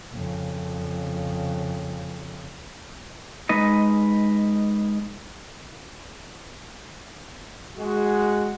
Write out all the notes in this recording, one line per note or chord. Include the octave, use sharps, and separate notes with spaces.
F2 C#3
G#3 D#4 B4 D#5
G#3 F#4